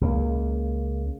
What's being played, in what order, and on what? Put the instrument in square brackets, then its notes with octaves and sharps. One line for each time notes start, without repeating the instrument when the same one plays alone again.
[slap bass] C#2 C#3 F#3 A#3